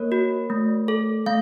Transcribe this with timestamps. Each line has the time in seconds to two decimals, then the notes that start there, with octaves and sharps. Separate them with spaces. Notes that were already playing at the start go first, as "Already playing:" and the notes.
Already playing: A#3 A#4 C#5
0.12 F#4
0.50 A3
0.88 A4
1.26 A3 F5